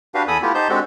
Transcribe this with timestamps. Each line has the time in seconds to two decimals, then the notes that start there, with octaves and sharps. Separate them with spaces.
0.15 D4 F#4 G4 B4 F5
0.28 E2 A4 G#5 B5 D#6
0.42 A3 B3 E4 F4 G4
0.55 D#4 G4 C5 A5 G6
0.69 G#3 C4 D4 F#4 G4 A4